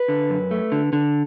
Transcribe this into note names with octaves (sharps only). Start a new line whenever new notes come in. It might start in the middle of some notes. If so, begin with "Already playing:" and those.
Already playing: B4
D3
F#2
A3
D3
D3